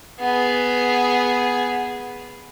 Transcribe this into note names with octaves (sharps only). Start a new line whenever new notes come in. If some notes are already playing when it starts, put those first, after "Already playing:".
B3 G#4